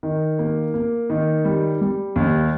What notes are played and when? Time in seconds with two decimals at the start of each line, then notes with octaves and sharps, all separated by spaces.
0.03 D#3
0.39 A#3
0.74 A#3
1.10 D#3
1.45 G3
1.81 G3
2.16 D#2